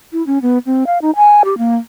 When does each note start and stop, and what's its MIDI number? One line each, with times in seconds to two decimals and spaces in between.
0.13 0.25 64
0.27 0.38 61
0.42 0.58 59
0.66 0.84 60
0.87 0.98 77
1.02 1.11 63
1.16 1.42 80
1.45 1.58 67
1.58 1.76 58